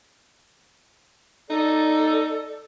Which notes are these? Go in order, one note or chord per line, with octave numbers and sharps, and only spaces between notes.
D#4 A4 D5